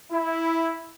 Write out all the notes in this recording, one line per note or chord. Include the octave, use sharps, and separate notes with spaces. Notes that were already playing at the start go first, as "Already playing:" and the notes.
E4